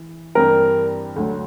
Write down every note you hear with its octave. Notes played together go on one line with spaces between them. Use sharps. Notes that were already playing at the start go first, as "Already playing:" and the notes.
Already playing: E3
G2 E3 G3 C4 A#4
D2 D3 F#3